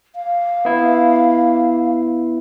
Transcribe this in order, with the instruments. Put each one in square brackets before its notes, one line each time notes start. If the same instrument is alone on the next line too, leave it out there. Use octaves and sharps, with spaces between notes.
[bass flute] F5
[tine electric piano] B3 E4